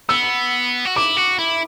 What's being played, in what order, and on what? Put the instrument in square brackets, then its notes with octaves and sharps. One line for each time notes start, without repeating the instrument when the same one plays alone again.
[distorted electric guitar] B3 [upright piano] E6
[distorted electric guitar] F#4
[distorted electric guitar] E4 [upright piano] D6
[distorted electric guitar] F#4
E4